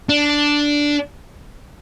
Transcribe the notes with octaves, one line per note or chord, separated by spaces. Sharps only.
D4